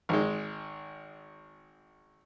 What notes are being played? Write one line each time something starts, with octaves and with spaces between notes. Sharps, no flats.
G#1 G#3